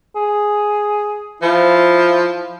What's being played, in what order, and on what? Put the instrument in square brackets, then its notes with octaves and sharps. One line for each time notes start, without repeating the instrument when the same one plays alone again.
[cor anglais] G#4
[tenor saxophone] F3 [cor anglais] E4